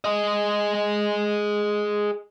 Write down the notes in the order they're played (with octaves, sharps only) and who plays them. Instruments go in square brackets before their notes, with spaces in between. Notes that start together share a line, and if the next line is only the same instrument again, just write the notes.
[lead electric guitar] G#4 D#5